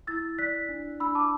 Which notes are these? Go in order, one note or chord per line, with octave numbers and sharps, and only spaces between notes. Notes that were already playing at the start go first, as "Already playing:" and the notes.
E4 E6 A6
D5 F#6 B6
D4
D4 B5 E6
A5 D6